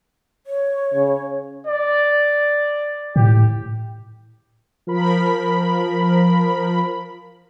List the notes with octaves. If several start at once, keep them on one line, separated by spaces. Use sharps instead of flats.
C#5
C#3
D5
A2 G4
F3 A#4 B5